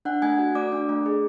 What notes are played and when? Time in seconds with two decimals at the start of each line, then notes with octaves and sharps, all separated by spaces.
0.05 D4 F#5 F#6
0.22 A3 G#5 G#6
0.39 F#4
0.55 A3 D5 D6
0.72 D4
0.89 A3
1.06 G#4